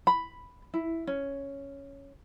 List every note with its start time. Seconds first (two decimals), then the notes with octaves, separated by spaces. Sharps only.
0.07 B5
0.74 E4
1.07 C#4